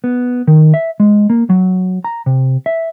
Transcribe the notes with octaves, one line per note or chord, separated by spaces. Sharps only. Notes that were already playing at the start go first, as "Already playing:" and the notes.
B3
D#3
E5
G#3
A#3
F#3
A#5
C3
E5